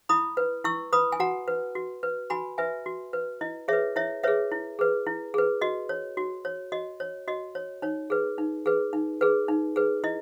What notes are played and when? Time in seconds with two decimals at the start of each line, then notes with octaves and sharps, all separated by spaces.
0.09 E4 B5 D#6
0.37 B4
0.64 E4 C#6 E6
0.93 B4 B5 D#6
1.12 G#5
1.20 F#4 F#5 A#5
1.48 B4
1.75 F#4
2.03 B4
2.30 F#4 G#5 B5
2.58 B4 E5 G#5
2.86 F#4
3.13 B4
3.41 E4 D#5
3.68 G#4 B4 C#5 E5
3.96 E4 C#5 E5
4.23 G#4 B4 C#5 E5
4.52 E4
4.79 G#4 B4
5.06 E4
5.34 G#4 B4
5.61 F#4 D#5
5.89 C#5
6.17 F#4
6.45 C#5
6.72 F#4 D#5
7.00 C#5
7.28 F#4 D#5
7.55 C#5
7.82 D#4 C#5
8.10 G#4 B4
8.38 D#4
8.66 G#4 B4
8.93 D#4
9.21 G#4 B4
9.48 D#4
9.76 G#4 B4
10.04 E4 D#5